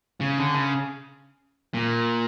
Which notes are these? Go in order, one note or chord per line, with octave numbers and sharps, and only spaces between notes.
C#3
D3
C#3
A#2